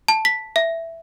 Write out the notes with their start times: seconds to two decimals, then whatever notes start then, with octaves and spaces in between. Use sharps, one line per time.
0.08 A5
0.25 B6
0.56 E5